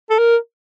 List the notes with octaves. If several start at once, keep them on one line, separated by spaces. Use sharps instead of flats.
A4
A#4